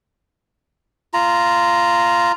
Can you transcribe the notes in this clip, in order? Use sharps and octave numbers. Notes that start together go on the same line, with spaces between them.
F4 A#5